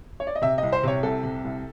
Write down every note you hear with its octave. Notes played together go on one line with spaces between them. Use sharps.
C#5
D5
D#5
C3 E5
C2 D#5
C5
C3 C#5
C2 A4
C3
C2